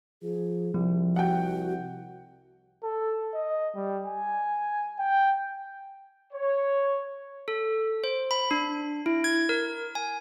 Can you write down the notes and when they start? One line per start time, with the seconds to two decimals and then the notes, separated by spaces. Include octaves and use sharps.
0.23 F3 G#4
0.74 C2 F3
1.16 F#4 F#5 G5
2.83 A4
3.34 D#5
3.75 G3
4.06 G#5
4.99 G5
6.33 C#5
7.48 A4
8.04 C5
8.31 B5
8.51 D4
9.06 E4
9.24 G#6
9.49 A#4
9.95 G#5